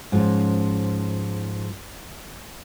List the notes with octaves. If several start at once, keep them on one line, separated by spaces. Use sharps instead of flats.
G#2 F3 C#4